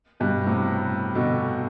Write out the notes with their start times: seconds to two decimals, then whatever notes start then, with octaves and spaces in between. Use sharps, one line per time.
0.20 G2 B2
0.47 A2 C3
1.15 B2 D3